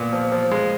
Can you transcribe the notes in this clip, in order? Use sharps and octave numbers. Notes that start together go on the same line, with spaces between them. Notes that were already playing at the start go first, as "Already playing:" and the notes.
Already playing: A#2 B3
F3
F3
G#3